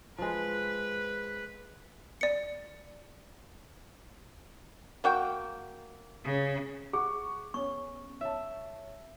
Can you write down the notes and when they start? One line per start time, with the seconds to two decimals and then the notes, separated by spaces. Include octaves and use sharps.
0.19 F3 G#3 B4
2.21 D5 C#7
5.04 A#3 F#4 G5
6.25 C#3
6.93 G#4 F#5 C#6
7.54 B3 C#4 C#6
8.21 C#5 E5 A5